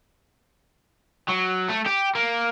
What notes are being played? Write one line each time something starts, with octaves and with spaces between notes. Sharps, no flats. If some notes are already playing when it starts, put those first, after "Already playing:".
F#3
A3
G4
A#3